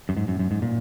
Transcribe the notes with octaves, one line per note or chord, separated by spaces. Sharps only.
F#2
G#2
F#2
F#2
G#2
A#2